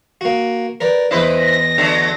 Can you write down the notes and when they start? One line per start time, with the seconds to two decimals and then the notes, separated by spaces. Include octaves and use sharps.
0.21 A#3 F#4
0.81 A#4 B4 D5
1.11 E2 E4 B4 C5 D#5
1.41 A#6
1.78 D3 F#3 A3